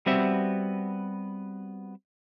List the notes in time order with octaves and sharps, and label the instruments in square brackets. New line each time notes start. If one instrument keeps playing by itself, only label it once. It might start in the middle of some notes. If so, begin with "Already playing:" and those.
[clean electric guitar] G3 B3 C4 F#4 E5